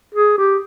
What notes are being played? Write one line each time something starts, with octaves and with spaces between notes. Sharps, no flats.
G#4
G4